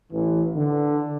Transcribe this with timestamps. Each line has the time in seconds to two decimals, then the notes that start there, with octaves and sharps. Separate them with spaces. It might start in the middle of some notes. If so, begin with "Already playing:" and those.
0.11 A1 E3
0.55 D3